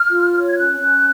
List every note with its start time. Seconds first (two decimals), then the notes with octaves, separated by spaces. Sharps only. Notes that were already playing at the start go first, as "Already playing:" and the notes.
Already playing: F6
0.10 F4
0.32 C#5
0.47 G#6
0.55 C#4 F#6
0.78 C#4